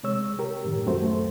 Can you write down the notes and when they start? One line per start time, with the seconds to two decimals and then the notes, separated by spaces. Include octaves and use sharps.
0.03 C3 G#3 C#5 E6
0.39 G4 A#4
0.65 F#2 A2 D#3
0.86 C2 F#2 A3 F#4 C5